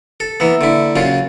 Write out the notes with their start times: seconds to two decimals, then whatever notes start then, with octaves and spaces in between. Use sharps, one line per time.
0.20 A4
0.40 E3 A#3 B3 E5 E6
0.61 D3 E4
0.96 F#2 C#3 F4